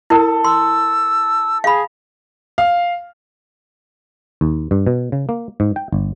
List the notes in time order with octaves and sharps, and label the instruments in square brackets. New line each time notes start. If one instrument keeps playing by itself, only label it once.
[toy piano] E4 A#4 [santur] A4
[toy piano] C6 [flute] E6
[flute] G#4 [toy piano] F5 B5
[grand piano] F5
[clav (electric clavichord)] D#2
G2
B2
C#3
A#3
G#2
G5
G1